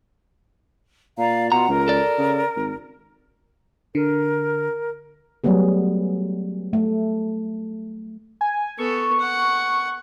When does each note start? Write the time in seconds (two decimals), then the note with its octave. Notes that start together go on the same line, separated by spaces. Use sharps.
1.18 A#2 D5 F5 A#5
1.52 B2 F4 F#5 A#5
1.69 C#2 A#4
1.88 A4 D5
2.18 C#3
2.56 G#1
3.95 D3 A#4
5.44 F#3 G3 A3 B3 G#4
6.73 A3
8.41 G#5
8.79 B3 A4 C#6
9.20 F#5